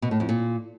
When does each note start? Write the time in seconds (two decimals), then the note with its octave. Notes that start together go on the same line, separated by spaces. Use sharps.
0.02 B2
0.11 A2
0.20 F2
0.29 A#2